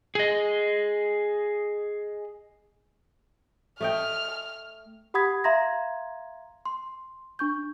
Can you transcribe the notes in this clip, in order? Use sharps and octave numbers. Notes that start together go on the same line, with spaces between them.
G#4 D#5
A3 D#5 G5 F6
G4 F#5 B5 D#6 G#6 B6
E5 F5 A#5 C6 G#6 A#6
C6
D4 C#6 G6